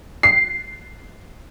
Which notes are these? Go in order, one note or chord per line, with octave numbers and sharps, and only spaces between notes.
C7